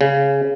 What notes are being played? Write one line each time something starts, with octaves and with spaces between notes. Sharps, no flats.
C#3